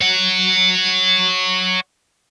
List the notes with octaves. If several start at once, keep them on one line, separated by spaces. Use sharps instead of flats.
C#5 F#5